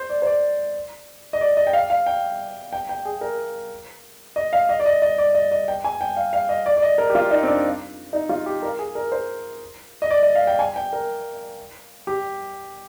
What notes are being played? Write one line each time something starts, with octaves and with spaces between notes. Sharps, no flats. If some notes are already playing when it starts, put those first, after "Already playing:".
Already playing: C5
D5
C5
D5
D#5
D5
D#5
G5
F5
F5
G5
G5
G5
G#4
A#4
D#5
F5
D#5
D5
D#5
D#5
D5
D#5
D#5
G5
G#5
G5
F5
F5
D#5
D5
D5
D#5
A#4
G4
F4
D#4
C4
D4
D#4
F4
G4
A#4
G#4
A#4
C5
D#5
D5
D#5
F5
G5
G#5
G5
A#4
G4